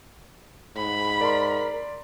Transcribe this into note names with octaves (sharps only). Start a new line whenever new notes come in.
G#2 B5
A#4 D5 C6